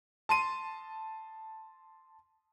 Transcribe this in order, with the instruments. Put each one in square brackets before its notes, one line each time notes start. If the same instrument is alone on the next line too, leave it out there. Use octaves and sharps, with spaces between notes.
[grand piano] A5 C6 D#7